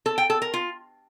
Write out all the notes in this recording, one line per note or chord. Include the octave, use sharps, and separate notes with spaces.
A4
G5
A4
A#4
F4